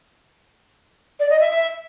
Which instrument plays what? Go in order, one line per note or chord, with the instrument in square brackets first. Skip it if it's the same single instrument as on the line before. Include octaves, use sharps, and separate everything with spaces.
[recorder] D5
D#5
E5
E5